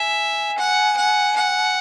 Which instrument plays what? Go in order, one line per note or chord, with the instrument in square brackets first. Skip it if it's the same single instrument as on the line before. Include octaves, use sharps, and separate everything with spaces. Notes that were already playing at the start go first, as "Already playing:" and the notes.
Already playing: [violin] E5 [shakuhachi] G#5
[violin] F#5
F#5
F#5